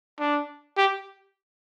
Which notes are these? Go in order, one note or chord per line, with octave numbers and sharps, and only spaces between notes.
D4
G4